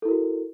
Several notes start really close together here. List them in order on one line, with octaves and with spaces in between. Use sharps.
A4 E4 A#4 F#4